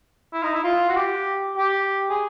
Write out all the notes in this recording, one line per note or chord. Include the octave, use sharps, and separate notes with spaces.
E4
D#4
E4
F4
F#4
G4
G4
G#4